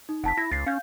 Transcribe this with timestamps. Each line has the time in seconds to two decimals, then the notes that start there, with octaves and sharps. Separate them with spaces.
0.09 D#4
0.24 F1 F#5 A5 B6
0.37 E4 A#6
0.52 C#2 A6 C7
0.66 C#4 F5 G6